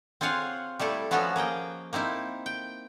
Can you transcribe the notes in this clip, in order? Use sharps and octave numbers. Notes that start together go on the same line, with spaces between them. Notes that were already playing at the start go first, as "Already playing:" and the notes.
C4 F4 G#4 C#5 F5 F#5
G3 A3 E4 A4
F3 B3 C#4 F#4 A4 C#5
A#3 G#4 D#5 G5
A#3 C4 D#4 E4
G5